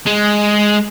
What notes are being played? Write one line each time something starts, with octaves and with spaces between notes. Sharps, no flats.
G#3